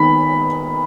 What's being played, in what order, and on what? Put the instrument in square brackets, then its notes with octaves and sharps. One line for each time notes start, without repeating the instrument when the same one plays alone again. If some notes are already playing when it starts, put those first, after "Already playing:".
Already playing: [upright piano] D#3 B3 B5